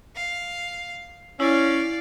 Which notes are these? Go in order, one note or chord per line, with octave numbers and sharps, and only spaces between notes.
F5
C#4 E4 D5 F5